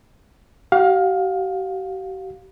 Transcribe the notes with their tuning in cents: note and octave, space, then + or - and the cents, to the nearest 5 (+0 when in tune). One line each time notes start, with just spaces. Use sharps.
G4 -45 F5 +20